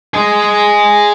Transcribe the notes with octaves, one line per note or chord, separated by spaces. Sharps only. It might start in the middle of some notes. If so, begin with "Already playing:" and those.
G#4 D#5